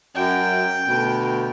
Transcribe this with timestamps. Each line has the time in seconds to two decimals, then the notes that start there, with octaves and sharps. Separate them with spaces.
0.15 F#2 G5
0.84 D2 B2